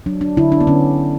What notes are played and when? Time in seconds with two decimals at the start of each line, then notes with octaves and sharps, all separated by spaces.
0.06 F#3 D4
0.21 D4
0.37 D3 E4
0.52 D4
0.61 B3
0.67 D3 C#4